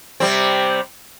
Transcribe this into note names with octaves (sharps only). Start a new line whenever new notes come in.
C3 G3 C4